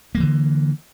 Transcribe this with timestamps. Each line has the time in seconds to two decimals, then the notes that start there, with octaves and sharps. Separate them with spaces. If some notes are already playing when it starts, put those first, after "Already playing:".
0.15 A#3
0.17 G#3
0.20 E3
0.23 D3